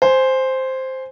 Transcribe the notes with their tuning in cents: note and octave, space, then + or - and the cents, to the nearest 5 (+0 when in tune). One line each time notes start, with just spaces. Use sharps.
C5 +0 G#5 +0